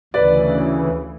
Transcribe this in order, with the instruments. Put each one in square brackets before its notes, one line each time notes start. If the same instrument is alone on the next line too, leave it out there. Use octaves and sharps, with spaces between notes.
[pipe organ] D2 C#3 E3 [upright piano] B4 D5